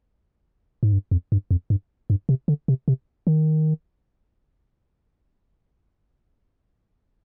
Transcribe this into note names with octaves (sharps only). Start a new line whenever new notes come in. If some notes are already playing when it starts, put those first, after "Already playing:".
G#2
G2
F2
G2
F2
G2
G2
C3
D3
C3
C3
D#3